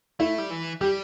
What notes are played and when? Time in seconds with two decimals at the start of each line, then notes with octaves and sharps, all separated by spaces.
0.20 A3 E4
0.38 G3
0.50 E3
0.81 G3 G4